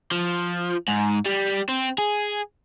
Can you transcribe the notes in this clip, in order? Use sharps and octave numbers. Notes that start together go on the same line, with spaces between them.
F3
G#2
G3
C4
G#4